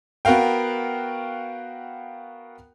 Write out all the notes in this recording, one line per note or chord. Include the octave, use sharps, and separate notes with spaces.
B3 F#4 A#4 F5 G5